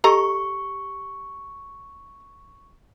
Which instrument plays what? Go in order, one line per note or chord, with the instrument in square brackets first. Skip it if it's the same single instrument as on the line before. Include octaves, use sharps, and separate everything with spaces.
[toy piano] G4 [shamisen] A4 D#5 A#5 [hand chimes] C#6